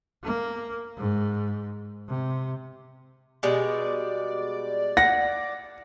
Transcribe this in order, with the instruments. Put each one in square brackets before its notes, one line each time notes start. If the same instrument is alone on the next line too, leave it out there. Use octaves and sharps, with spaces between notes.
[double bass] A#3
G#2
C3
[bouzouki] B2 G3 G#3 [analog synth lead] D5
[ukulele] F#5 [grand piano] A#6